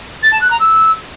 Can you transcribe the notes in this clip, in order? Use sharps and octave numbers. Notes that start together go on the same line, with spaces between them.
A6
A5
F#6
A#5
E6